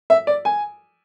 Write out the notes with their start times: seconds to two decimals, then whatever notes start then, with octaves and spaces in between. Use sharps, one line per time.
0.10 E5
0.27 D5
0.45 G#5